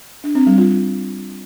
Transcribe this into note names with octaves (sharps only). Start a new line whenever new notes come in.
D4
C4
G3
F4